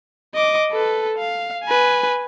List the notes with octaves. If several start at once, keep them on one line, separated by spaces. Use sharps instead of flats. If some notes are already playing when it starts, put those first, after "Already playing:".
D#5 D6
A4 B4
F5
B4 G#5